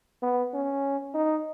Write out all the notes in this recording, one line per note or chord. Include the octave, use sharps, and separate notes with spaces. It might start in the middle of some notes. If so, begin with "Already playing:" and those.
B3
C#4
D#4